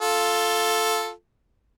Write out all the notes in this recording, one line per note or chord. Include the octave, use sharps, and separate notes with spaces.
F4 A4